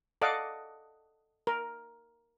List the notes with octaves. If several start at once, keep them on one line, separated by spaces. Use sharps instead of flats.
A4 D5 D#5 F5 F#5 D6
A#4